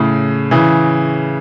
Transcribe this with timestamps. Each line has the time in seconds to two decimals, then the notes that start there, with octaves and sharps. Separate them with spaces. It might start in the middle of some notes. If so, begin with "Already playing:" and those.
Already playing: A2 C#3
0.51 C#3 E3